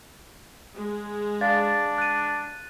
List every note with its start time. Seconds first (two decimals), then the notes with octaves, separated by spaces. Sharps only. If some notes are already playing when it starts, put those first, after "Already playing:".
0.74 G#3
1.41 D4 D5 F5 A6
1.98 F#6 D#7